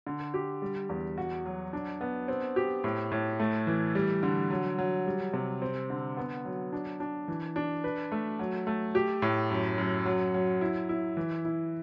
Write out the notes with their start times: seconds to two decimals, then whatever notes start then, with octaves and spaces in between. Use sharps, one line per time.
0.07 D3
0.34 G4
0.62 G3
0.89 E2
1.18 F#4
1.45 F#3
1.73 D4
2.01 B3
2.28 C4
2.56 G4
2.84 A2
3.12 A2
3.40 A3
3.67 E3
3.95 G3
4.23 D3
4.50 F#3
4.78 F#3
5.06 G3
5.34 C3
5.62 C4
5.90 D3
6.17 B3
6.45 F#3
6.72 D4
7.00 D4
7.28 E3
7.56 D4
7.84 B4
8.12 A3
8.39 F#3
8.67 A3
8.95 G4
9.22 A2
9.50 F#2
9.78 F#2
10.06 F#3
10.34 F#3
10.61 E4
10.89 E4
11.17 E3
11.45 E4